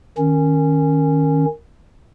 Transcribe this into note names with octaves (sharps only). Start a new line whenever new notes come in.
D#3 C#4